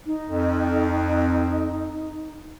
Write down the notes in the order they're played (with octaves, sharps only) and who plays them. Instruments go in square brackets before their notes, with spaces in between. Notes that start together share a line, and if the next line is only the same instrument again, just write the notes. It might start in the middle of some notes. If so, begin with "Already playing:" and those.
[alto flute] D#4
[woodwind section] F2